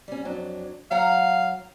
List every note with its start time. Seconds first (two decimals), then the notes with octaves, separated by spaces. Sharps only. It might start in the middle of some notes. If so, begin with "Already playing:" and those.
0.08 G3 C#4
0.25 F2 F#3 D4
0.91 F#3 F5 F#5 A#5